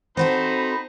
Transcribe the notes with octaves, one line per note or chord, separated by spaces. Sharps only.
C4 D#4 F#4 A4 C5 B5